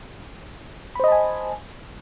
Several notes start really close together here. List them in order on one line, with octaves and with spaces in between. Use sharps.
B5 C5 D#5 A5 G#5